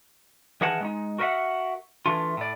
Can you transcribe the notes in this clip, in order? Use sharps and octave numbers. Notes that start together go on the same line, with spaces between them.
D#3 E3 G#4 A#4 F#5 A5
G#3 C#4 D#4
F#4 A#4 B4 D#5 E5 F#5
E3 A3 D4 F4
A2 D5